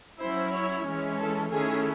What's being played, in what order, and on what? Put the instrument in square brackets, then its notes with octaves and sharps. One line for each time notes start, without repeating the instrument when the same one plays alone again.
[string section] F#3 C#4 E4 C5
C#5
E3 G#3 C#4
A4
D#3 A3 C#4 E4 G#4